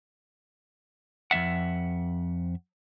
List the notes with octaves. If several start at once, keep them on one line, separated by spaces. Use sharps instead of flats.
F2 B3 E5 F#5